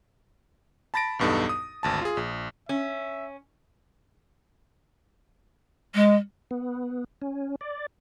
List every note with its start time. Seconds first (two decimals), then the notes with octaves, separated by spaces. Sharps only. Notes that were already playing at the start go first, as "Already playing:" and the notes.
0.94 A5 B5 A6 A#6 D7
1.19 B1 E2 G2 B3 D#4 A4
1.49 D#6
1.83 G#1 D2 A5
2.01 F4 G#4
2.17 A#1
2.69 C#4 E5
5.94 G#3
6.51 B3
7.22 C#4
7.61 D5